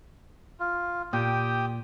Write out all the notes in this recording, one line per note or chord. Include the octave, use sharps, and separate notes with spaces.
F4
A#2 G4 G5 D#6